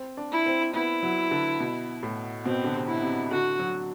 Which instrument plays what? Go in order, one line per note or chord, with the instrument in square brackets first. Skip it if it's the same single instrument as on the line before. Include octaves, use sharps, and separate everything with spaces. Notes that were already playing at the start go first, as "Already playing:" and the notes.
Already playing: [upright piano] C4
D4
[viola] E4
[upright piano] C4
[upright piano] B3 [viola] E4
[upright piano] F#3
D3
B2
A2
[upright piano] B2 [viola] C4
[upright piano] D3
C3
[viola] E4
[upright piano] C3
[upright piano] D3 [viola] F#4
[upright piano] F#3